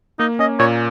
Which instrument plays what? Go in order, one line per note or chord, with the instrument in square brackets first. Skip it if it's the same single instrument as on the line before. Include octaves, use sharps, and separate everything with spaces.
[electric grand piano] A#3 [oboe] D#4
[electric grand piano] C#4 [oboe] D#5
[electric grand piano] A#2 [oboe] C#5